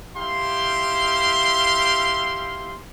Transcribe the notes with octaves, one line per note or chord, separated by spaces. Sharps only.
E4 G4 F5 C6